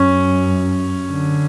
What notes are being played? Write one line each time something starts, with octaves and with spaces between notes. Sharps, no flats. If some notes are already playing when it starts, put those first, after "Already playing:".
Already playing: F#2 C#4
D3